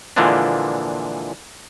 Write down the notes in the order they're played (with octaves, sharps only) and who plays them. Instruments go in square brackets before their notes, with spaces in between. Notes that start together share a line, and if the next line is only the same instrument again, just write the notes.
[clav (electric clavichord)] A#2 D3 E3 F3 G#3 D4